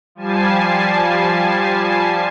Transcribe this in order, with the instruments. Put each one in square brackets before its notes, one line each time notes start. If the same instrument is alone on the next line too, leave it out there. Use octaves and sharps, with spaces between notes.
[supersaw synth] F3 G3 G#5 A5 C7